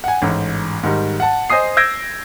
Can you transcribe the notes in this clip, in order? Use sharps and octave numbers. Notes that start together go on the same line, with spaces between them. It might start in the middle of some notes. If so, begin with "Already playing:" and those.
F#5 G#5
A1 G#2
G#2 D#3 G3
F#5 A5
C5 D#5 G#5 D#6 C7
E6 G6 G#6 A#6 D7